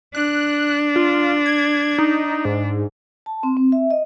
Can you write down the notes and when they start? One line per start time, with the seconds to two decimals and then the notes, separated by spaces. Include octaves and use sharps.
0.15 D4 F#6
0.96 F4
1.46 G#6
1.98 D#4
2.45 G#2
3.26 A5
3.43 C4
3.57 C4
3.72 E5
3.91 D#5